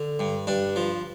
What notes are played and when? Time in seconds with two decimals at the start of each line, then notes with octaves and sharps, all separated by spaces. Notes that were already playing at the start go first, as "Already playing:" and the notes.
Already playing: D3
0.19 G2
0.47 G2 D4
0.76 F3